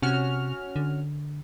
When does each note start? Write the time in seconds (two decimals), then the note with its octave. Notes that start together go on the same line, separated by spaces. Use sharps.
0.02 C3 C#4 F#4 F6
0.76 D3